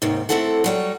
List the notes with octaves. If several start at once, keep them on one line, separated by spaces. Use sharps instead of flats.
D#2 G#2 C3 D#3
A3 A#3 C4 E4 A4 F#5
F#3 G3 C#5